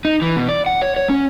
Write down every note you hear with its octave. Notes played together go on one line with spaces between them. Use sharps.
D#4
E3
B2
D5
F#5
C#5
C#5
C#4